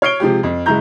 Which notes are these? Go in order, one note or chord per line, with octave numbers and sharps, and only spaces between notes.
C#5 F6 C7 D7 G7
C3 F3 G#3 G4
F2
F#1 G#3 E4 A#5 G6